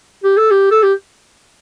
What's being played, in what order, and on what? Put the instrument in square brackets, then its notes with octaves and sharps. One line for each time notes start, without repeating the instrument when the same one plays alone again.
[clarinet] G4
A4
G4
A4
G4